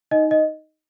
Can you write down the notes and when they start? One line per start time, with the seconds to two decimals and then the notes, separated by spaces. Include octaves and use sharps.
0.11 D#4 D#5
0.31 D#5